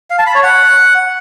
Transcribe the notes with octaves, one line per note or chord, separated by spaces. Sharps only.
F5
A5
B5
C#5
F#5